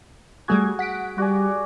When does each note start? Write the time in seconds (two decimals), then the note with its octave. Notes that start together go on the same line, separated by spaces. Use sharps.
0.48 G3 A3 F#4 G#4 G#6
0.79 F#5 B6 D7
1.18 G3 F#4 D5 G#5